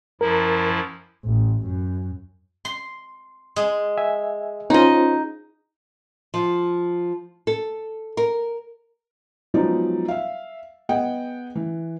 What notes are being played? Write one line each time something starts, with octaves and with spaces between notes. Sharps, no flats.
F#2 F3 E4 A#4
A1
F#2
C6
G#3
E5 G#5
C#4 D#4 F4 C5 D#5
F3
A4
A#4
F3 F#3 G#3 B3 D#4 D5
E5 F5
B3 G#4 D#5 F#5 G5
E3